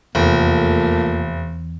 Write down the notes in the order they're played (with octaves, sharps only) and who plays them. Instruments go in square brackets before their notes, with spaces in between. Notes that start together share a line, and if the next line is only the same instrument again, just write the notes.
[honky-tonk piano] F1 [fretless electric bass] E2 [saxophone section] A3 A#3 F4